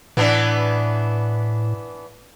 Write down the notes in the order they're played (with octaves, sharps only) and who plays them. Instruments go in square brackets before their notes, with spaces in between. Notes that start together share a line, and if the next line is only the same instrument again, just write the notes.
[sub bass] A2 [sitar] E3 B3 D4